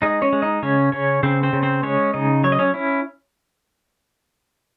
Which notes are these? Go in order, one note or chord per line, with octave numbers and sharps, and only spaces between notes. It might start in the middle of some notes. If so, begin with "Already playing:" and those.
G#3 D#4 D#5
C#4 C#5
G#3
D#4 D#5
C#3 C#4 C#5
C#3 C#4 C#5
C#3 C4 C5
C4 C5
C#3
C4 C5
G#3 C#4 C#5
C#3 D#4 D#5
F#3 C#5
D#5
C#4 C#5
C#4 E4